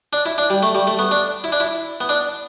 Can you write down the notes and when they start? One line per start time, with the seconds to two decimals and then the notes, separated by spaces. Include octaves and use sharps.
0.13 D4
0.26 E4
0.38 D4
0.50 G3
0.63 A3
0.75 G3
0.87 A3
0.99 B3
1.11 D4
1.44 E4
1.52 D4
1.60 E4
2.01 B3
2.09 D4